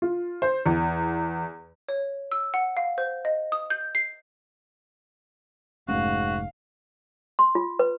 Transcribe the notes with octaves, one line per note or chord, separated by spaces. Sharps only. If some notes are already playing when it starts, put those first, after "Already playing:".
F4
C5
E2
C#5
E6
F#5
F5
C5
D#5
D#6
G6
C7
F1 G#2 A3 C#4 F#4 F5
C6
F4
B4